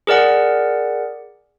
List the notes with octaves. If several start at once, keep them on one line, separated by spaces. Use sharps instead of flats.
G#4 A#4 D5 F#5